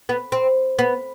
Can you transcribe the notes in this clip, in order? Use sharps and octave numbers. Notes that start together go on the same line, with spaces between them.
B3
C4
B3